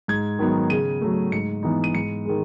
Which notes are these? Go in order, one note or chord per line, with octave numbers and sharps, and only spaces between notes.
G#2 G#6
D#3 F#3 B3 D#4
C#3 D#7
F#3 A3
G#2 C#7
E3 B3 D#4
D#7
G#2 C#7
D#3 G#3